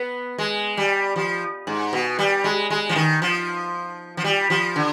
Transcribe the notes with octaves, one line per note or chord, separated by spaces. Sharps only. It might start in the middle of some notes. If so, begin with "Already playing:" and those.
Already playing: B3
G#3
G3
F3
G#2
B2
G3
G#3
G#3
F3
D#3
F3
F3
G3
F3
D3